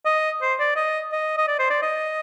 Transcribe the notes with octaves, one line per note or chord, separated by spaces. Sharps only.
D#5
C5
D5
D#5
D#5
D#5
D5
C5
D5
D#5